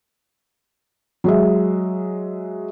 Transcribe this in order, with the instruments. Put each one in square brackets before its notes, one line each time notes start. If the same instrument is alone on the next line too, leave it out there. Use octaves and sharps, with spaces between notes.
[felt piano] F#3 G#3 E5